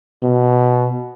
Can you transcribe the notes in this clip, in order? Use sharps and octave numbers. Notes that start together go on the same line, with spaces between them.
B2